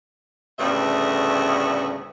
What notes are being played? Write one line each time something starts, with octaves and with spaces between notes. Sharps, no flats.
D2 A2 C#3 G3 B3 E5